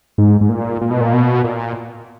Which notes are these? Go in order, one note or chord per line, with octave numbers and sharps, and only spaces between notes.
G#2
G#2
A#2
A#2
B2
A#2
B2
A#2